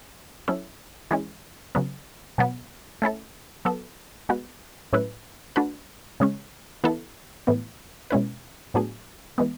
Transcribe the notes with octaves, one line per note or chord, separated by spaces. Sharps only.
F#3 C#4 E4 A4
E3 G#3 C#4
C#3 F#3 B3
B2 F#3 B3
A3 C#4 E4 A4
F#3 B3 F#4 A4
G#3 B3 F#4 B4
A2 F#3 C#4 E4 B4
A3 D4 F#4 B4
C#3 G#3 C#4
E3 B3 E4 A4
A2 E3 B3
B2 G#3 C#4 E4 B4
A2 F#3 B3 D4 G#4
E3 G#3 B3